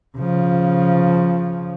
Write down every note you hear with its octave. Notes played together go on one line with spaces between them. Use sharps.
C#3 F3